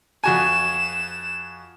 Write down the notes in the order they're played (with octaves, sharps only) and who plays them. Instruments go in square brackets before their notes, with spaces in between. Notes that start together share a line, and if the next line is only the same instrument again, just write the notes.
[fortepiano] F2 F#4 G#5 [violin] E7